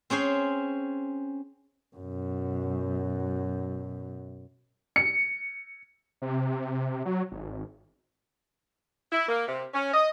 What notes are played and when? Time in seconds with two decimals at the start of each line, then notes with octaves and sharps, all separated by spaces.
0.10 C4 C#4 G#4 C5
1.96 F#2 B2
4.96 C#7
6.22 C3
7.05 F#3
7.31 G#1
9.12 E4
9.28 A#3
9.48 C3
9.74 C#4
9.93 D#5